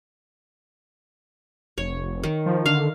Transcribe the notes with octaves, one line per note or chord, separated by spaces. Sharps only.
F1 C#5
D#3
F3
D3 F5